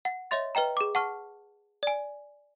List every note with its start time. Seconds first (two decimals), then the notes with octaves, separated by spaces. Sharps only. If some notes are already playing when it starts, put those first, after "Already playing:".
0.05 F#5
0.31 C#5 D#5 E5 C6 A6
0.55 B4 D#5 G5 A#5
0.77 G#4 D6
0.95 F#5 A5 C#6 F6
1.83 D5 G#5